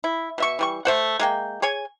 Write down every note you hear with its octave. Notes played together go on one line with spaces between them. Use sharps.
E4
B2 E5 C#6
E3 G3 C#6
A3 C5 F#5
G#3 A#3 G5
G#4 C#5 G#5